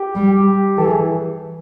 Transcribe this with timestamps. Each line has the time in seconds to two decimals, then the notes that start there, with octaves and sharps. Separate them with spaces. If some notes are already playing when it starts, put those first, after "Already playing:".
Already playing: G4
0.15 G3
0.31 G4
0.78 E3 A4
0.86 G#4